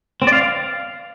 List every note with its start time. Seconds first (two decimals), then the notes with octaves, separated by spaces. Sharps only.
0.22 C4
0.27 D5
0.32 F5